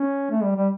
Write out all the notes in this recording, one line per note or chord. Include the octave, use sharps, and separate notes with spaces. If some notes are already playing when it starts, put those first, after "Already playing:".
Already playing: C#4
A3
G3
G3